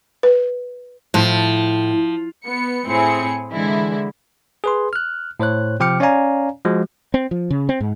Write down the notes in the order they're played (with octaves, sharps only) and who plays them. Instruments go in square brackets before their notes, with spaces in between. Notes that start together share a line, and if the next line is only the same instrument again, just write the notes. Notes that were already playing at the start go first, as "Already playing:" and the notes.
[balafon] B4
[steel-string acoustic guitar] A2 [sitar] F3
[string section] B3 C#7
A2 C4 E4 G#4 C#7
D3 E3 G#3 E4
[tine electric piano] G#4 B4 C6
F6 F#6
A2 C5 C#5 F#6
C3 F3 G5 D6 F6 C#7
C#4 C#5 D5 F5 G#5 A#5
F3 G#3 F#4
[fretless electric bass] C4
F3
C#3
C4
G#2